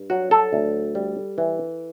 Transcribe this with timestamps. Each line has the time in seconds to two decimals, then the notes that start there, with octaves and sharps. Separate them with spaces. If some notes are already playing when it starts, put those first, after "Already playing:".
Already playing: G2
0.10 F#3 F#4
0.31 A4
0.53 D2
0.95 G3
1.38 E3